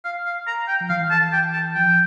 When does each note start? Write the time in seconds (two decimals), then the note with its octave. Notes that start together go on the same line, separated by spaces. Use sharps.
0.05 F5
0.25 F5
0.47 A#5
0.68 G5
0.81 F3
0.89 E3 F5
1.11 A5
1.33 G5
1.53 A5
1.75 F3 G5